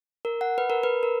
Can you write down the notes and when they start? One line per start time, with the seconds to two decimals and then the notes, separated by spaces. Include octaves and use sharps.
0.25 A#4
0.41 F#5
0.58 B4
0.70 A#4
0.83 B4
1.03 A#4